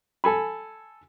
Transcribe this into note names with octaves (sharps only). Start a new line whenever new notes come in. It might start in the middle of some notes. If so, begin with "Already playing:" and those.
A4 G#5 B5